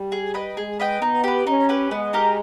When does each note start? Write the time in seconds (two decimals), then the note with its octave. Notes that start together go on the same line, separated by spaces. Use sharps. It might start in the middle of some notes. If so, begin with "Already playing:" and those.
Already playing: G3
0.12 G#4
0.34 B4 D#5 G5
0.57 G#3 G#4
0.80 B4 D#5 G5
1.01 B3 D#4
1.24 G4 B4
1.47 C#4 D#4
1.69 G4 B4
1.91 G#3 B3
2.13 D#4 G4 A#4